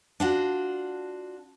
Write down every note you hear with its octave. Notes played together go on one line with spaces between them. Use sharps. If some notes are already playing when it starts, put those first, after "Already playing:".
D4 F4 F#4